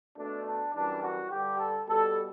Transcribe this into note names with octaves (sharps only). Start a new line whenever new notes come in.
B2 A3 D4
D4
F#2 E3 G3 D4
F#4
G2 D3 G3 G4
A4
B2 G3 A4